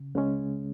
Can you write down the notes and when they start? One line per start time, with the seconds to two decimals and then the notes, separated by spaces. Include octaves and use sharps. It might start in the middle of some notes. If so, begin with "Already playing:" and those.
Already playing: C#3
0.15 C#2 C#3 G#3 C#4